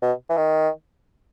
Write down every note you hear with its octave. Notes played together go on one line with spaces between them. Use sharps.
B2
E3
D#3